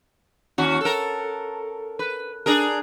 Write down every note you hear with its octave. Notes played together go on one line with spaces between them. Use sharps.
D#2 C#4 F#4
A4 A#4
B4
D4 G#4 A#4